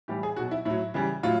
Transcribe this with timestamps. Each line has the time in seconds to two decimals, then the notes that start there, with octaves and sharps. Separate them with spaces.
0.08 A2 E3 G3 G4
0.23 G#4
0.36 B2 F#3 F#4
0.51 E4
0.65 A2 F#3 E4
0.94 C#3 E3 G3
1.23 A2 F#3 F4